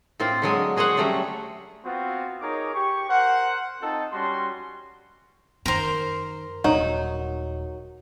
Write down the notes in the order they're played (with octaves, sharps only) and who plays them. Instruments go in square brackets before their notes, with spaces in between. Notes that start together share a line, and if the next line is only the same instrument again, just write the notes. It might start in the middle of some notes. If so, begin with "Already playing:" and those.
[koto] A2 C4 F4 C5
D3 F#3 G#3 G#5
F#4 G#4 C5 C#5 F#5
F#3 G3 A3 C#4
[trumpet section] B3 C4 F4 F#4 C5
D#4 G#4 A#4 C#5 D6
G4 C#6
A#4 C5 F#5
C4 D#4 F4 A4
G3 C#4 F#4 C6
[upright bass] F#2 D#3 [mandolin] A#4 C5
[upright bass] D#1 [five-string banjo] F#3 D#4